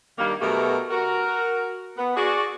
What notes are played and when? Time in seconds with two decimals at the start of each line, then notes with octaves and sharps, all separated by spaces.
0.18 G2 D#3 G3 A#3
0.41 B2 F#3 A3 F#4 G4 A#4
0.91 F#4 A#4
1.97 B3
2.17 F#4 G#4 D5